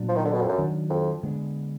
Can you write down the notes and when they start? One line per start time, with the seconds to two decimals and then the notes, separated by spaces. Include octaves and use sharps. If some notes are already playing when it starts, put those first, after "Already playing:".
Already playing: A#2 F#3 B3 D4
0.08 F3
0.16 D#3
0.25 D3
0.33 B2
0.41 F2
0.49 F#2
0.58 D#3 F#3 D4
0.90 F2
1.23 D3 G#3 B3 D4